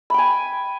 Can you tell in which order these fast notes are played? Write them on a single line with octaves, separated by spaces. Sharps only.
B5 G5 G#5